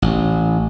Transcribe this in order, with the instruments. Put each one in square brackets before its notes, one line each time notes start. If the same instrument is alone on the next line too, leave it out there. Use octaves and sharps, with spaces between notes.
[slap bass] A1